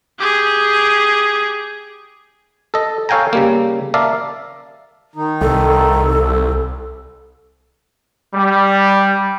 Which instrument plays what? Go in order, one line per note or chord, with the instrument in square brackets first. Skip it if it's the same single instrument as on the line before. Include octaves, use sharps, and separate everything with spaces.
[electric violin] G4 G#4
[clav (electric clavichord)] A4 D#5
A4 C#5 F5 G5 G#5 A#5
C#3 G3 A#3
A#4 D5 E5 F5 A5
[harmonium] D#3 D#4
[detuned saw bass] C2 [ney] A4
[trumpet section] G3